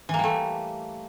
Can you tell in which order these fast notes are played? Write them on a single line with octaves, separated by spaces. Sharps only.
E3 A#3 G3 A3